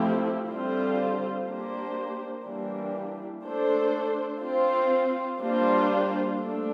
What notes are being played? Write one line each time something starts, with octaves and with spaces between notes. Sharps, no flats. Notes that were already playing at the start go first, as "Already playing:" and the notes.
Already playing: F3 A3 C4 E4 G4
D3 G3 C4 F4 C5
A#3 D4 G4 C5
E3 G3 A#3 D4 G4
A3 D4 A4 C5
C4 F4 C5
G3 A#3 D4 F4 C5
A3 D4 A4